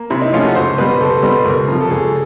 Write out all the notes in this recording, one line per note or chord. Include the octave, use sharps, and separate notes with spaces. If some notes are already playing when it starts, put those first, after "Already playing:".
Already playing: A#3
C3 E4
D#4
F3 A3 C#4 F4
F#4
C#2 C5
B2 G3 B4
C#2 A4
B2 G3 B4
C#2 A#4
C3 F3
A4
C#2 G#4